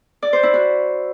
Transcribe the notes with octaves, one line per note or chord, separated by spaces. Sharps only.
D5
C5
E4
F#4